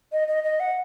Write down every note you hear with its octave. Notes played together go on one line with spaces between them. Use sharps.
D#5
D#5
D#5
F#5